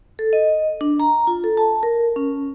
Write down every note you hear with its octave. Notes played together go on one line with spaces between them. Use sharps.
A4
D#5
D4
A#5
F4
A4
A5
A#4
C#4